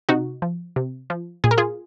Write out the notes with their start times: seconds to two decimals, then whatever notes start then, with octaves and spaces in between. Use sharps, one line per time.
0.09 C3 D#4 F#4
0.42 F3
0.76 C3
1.10 F3
1.44 A#2 G#4
1.51 A#4
1.58 F4 G#4